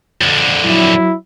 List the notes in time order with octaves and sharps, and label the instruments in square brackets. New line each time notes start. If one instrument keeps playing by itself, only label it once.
[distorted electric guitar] F2 D3
[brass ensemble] F#3 E4